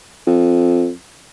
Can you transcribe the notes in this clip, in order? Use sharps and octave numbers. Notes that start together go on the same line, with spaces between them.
F2